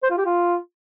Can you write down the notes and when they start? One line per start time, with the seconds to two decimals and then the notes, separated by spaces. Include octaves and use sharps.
0.03 C5
0.10 F4
0.18 G4
0.25 F4